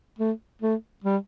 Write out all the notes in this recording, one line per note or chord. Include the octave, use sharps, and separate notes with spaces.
A3
A3
G3